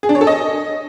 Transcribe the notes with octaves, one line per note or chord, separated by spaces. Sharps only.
G#4
D4
C#5
A4
D#5